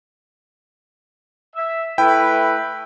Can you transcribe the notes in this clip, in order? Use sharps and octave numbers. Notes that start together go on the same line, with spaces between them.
E5
A3 E4 B4 G5